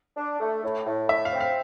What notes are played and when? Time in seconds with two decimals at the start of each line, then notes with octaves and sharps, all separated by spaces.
0.17 D4
0.40 A3
0.64 A2
0.86 A2
1.09 A2 E5
1.25 F5
1.33 C4
1.40 F5